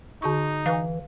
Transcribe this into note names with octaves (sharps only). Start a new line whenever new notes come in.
D3 D#4 F#4 C#6
E3 B4 F5